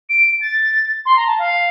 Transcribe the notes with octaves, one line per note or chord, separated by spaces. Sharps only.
D7
A6
C6
A#5
A5
F5